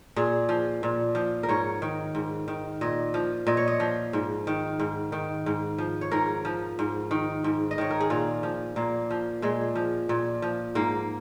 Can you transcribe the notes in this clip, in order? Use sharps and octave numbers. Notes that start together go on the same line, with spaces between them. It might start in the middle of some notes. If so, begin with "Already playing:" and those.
A#2 G#4
F3
A#2
F3
A#4
G#2 C#5
D#3
G#2
D#3
A#2 D#5
F3
A#2 D#5
C#5
D#5
F3
G#2
D#3
G#2
D#3
G#2
F3
C#5
G#2 A#4
F3
G#2
D#3
G#2
D#5
D#3 C#5
A#4
G#4
A#2 F4
F3
A#2 A#3
F3
A#2 G#3
F3
A#2
F3
G#2 A#3